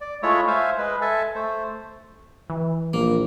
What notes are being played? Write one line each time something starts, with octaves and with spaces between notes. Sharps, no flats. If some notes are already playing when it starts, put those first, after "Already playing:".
D5
G#3 A3 E4 F4 C#5 E5
C5 E5 F5 G#5
G#3 B4
A4 E5 G#5 A5
A3 C5
E3
A#1 A#3